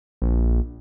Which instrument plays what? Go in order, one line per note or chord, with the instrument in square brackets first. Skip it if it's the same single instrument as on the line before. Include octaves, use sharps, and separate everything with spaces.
[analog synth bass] A#1